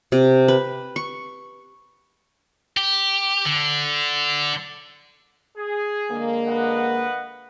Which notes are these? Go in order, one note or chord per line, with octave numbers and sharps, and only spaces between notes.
C3
B4
C#6
G4
D3
G#4
D3 G#3 A#3
B4 D#5 F#5